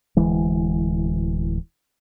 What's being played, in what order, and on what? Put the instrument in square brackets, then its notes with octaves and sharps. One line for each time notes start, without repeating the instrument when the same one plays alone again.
[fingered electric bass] D1 E3 G#3